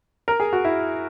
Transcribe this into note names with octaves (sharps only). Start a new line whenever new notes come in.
A#4
G#4
F#4
E4